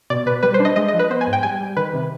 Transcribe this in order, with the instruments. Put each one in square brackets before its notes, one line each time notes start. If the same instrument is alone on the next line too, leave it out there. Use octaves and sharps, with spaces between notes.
[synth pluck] B2 D5
B2 B4
G3 B4
C5
D4
D#5
G#3 D#5
D#5
F3
B4
B3 C5
G#5
G#2
G5
G3 G#5
G3
D#3 B4
C3